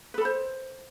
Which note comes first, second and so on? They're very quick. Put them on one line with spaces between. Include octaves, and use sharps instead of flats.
B4 A4 B5 C5